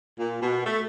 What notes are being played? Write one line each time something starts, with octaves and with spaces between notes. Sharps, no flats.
A#2
B2
A3